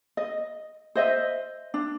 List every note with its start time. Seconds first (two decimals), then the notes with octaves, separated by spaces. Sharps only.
0.17 D#5
0.95 C5 D#5 E5
1.74 D4